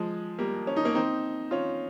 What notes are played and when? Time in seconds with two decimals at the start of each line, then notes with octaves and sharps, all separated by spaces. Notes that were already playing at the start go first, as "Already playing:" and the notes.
Already playing: F3 G#3
0.39 G3 A#3
0.67 C#4
0.76 D#4
0.85 A#3 C#4
0.95 C4 D#4
1.51 C#4 F4